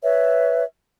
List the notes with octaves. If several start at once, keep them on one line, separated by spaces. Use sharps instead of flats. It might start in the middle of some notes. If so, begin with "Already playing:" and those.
B4 C#5 E5